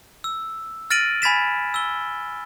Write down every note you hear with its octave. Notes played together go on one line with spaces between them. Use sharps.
E6
F6 A6 A#6 D7 D#7 F#7
G#5 B5 G#6 A6 B6 E7
E6 G7